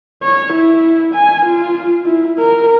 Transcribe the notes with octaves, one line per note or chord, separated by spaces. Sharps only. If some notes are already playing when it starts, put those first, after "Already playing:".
C#5
E4
G#5
F4
E4
A#4